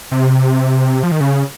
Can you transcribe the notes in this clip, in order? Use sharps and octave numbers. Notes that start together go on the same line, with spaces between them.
C3
F3
D#3
C#3